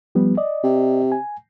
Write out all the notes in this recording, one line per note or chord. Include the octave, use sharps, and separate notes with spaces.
F3 G3 B3
D5 D#5
C3
G#5